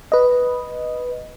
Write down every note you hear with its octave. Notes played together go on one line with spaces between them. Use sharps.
B4 D#5